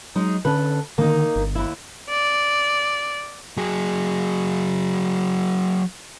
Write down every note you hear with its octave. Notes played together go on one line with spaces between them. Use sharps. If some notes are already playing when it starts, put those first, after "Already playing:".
F#3 G#3 D#4
D3 C#4 A4 B4
D3 D#3 A#3 D#4
G1
D#2 E4
D5
F#3 G#4